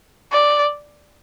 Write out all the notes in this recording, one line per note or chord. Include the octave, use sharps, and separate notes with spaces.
D5